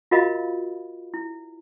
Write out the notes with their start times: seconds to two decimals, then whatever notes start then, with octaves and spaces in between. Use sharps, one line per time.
0.11 F4 F#4 A#4 D#5 F5 B5
1.14 E4